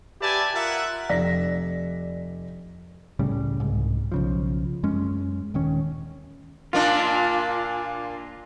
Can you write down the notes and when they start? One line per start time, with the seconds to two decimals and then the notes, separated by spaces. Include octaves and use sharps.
0.21 G4 B4 D5 E5 G#5 A5
0.54 F4 A#4 E5 F#5
1.09 F1 D5 A#6 B6
3.19 C#2 A2 C#3 G3
3.60 C2 G#2
4.12 B1 C#3 F3
4.83 F#2 G#3 C#4
5.54 D#1 D#3 C#4
6.73 A#2 A#3 D4 F4